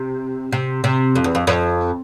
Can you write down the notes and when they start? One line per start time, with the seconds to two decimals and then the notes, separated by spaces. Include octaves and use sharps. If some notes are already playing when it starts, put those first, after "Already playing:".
Already playing: C3
0.52 C3
0.84 C3
1.16 F2
1.24 E2
1.35 F2
1.47 F2